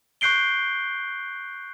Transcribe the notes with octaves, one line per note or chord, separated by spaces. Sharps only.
C#6 F#6 G6 C7 D7 G7